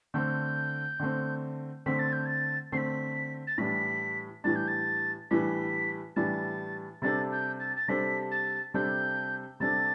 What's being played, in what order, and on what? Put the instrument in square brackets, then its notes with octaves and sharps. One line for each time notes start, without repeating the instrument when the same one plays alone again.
[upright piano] D3 A3 C4 [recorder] G6
[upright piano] D3 A3 C4
[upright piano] D3 A3 C4 [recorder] B6
[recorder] A6
G6
A6
[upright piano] D3 A3 C4 [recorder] B6 C7
[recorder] A6
[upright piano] A2 E3 G3 D4 [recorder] B6
[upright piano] A2 E3 G3 D4 [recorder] A6
[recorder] G6
A6
[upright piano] A2 E3 G3 D4 [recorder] B6
[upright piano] A2 E3 G3 D4 [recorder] A6
[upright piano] C3 G3 D4 A4 C5 [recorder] A6
[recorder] G6
A6
A6
[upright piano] C3 G3 D4 A4 C5 [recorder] B6
[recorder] A6
[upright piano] C3 G3 D4 A4 C5 [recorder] G6
[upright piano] C3 G3 D4 A4 C5 [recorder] A6